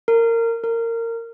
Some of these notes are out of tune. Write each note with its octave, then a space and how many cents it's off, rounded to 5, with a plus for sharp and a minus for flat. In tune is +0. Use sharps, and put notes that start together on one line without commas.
A#4 -20
A#4 -20